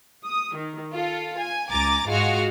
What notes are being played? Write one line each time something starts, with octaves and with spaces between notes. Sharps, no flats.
D#6
D#3
F4 A4
G#5
C#2 G#5 A#5 D6 A6
G#2 G#3 F4 F#4 F6